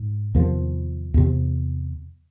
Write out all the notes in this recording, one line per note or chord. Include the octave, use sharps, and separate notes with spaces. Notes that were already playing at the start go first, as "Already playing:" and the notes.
Already playing: G#2
E2 C3 D#3 F3
E2 C3